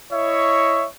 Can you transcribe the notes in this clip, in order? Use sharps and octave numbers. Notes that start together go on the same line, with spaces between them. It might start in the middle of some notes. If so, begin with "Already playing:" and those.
E4 C#5 D#5 E5 C#6